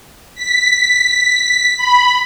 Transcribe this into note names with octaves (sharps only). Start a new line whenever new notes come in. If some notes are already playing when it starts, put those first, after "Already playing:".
B6
B5